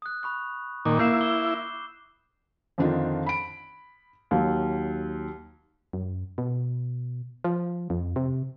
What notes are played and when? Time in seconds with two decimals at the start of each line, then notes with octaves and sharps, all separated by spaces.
0.02 D#6 F#6
0.23 B5 C#6 F#6
0.86 A#2 D#3 D6
0.99 A#3 E4 G6 C7 E7
1.21 D6 E6 G7
2.78 F2 D3 D#3 D4 D#4 F4
3.26 B5 D7
4.31 D#2 F#3
5.93 F#2
6.38 B2
7.44 F3
7.90 F2
8.16 C3